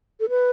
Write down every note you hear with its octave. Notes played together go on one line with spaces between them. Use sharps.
A4
B4